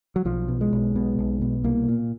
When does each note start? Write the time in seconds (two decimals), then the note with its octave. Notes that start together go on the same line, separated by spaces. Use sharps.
0.16 F#3
0.25 B1 F3
0.48 B2
0.61 G#3
0.73 B1
0.95 B2
1.19 B1
1.42 B2
1.64 C2 A#3
1.88 A#2